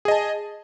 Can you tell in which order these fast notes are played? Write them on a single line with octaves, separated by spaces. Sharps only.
G#4 D#5 A5